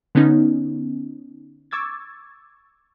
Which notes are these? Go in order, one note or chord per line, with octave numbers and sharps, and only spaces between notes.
D3 B3 C#4 D#4
C#6 D6 E6 G#6 A6